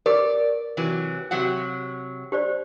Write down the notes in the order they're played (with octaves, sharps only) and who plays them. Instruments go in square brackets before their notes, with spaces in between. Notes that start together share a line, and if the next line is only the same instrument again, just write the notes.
[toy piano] G4 A#4 B4 [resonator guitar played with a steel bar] D5
[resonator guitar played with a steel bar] C3 E3 F#3
C3 F#3 F#5
[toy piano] G4 C5 D5